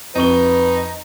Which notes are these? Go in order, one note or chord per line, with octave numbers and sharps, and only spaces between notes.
F2 D#4 B4 C#6 G7